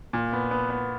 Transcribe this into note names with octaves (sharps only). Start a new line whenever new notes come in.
A#2
B3
B3
B3